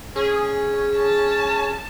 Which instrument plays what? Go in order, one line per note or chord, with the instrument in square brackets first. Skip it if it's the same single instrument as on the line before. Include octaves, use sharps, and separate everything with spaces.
[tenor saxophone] C#4 [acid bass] G#4
[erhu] A5